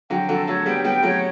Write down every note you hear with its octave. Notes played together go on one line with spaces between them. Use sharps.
D3 F#3 G5
D3 F#3 A4
F#3 A3 C#5
G3 B3 G5
G3 B3 G5
F#3 A3 C#5